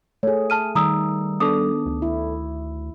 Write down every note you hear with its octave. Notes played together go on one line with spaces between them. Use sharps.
A3 G#4 C#5
A5 F6 D#7
D#3 G3 A#5 D#6 E6
B3 D4 A4 D6 D#6
D2
E4